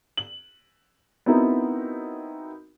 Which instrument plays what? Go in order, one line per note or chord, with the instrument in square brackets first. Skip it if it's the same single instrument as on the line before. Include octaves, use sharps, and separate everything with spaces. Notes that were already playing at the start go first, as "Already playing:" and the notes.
[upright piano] F#7
B3 C4 D#4 E4 F#4 A#4